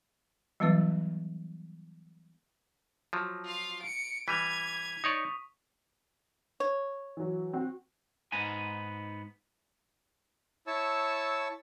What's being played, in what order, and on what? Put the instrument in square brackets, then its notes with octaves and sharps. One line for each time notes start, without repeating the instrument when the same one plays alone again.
[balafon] E3 F#3 G3 B3 E4 B4
[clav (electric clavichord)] F3 F#3
[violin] F4 F5
C#7 D7
[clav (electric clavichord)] E3 G3 [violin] G#6 [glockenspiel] B6 D#7 F7
[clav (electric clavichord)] D#4 C#5 D5 [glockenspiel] C#6 D#6
[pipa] C#5
[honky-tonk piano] E3 F#3
C4 F#4
[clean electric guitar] G#2 B3 D#4 G#5
[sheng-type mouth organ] E4 C#5 A5 C#6 E6